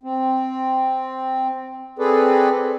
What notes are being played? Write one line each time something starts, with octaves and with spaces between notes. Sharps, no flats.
C4
C4 G#4 A4 B4 D5